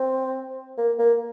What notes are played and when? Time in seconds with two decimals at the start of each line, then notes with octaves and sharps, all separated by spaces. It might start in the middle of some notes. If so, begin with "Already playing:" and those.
Already playing: C4
0.78 A#3
0.99 A#3